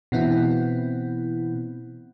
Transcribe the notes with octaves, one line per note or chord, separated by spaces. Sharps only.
B2 E3 B3 C4 E4